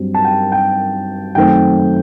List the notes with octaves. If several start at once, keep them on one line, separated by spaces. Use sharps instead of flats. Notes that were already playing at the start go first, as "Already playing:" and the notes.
Already playing: G2 F#3 C4
A5
G5
G5
F#2 D#3 A3 C4 G5